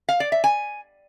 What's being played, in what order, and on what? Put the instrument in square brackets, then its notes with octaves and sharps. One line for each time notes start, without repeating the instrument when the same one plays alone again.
[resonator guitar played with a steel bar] F5
D5
E5
G#5